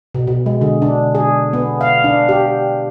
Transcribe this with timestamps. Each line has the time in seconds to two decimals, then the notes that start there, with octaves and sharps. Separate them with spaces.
0.15 B2
0.27 B2
0.46 G#3
0.61 D3
0.82 D4
1.15 G#4
1.53 B3
1.81 F5
2.04 D4
2.29 G4